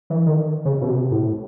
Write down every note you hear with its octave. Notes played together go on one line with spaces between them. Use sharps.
E3
D#3
C#3
B2
C3
A2